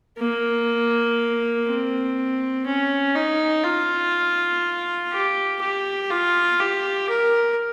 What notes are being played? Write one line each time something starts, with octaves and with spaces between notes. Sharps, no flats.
A#3
C4
C#4
D#4
F4
G4
G4
F4
G4
A#4